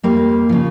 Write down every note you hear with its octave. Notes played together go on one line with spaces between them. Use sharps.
F2 G3 A#3
C#3 F3